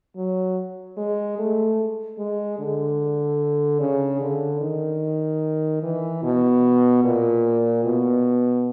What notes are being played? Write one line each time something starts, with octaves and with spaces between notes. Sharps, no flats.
F#3
G#3
A3
G#3
D3
C#3
D3
D#3
E3
B2
A#2
B2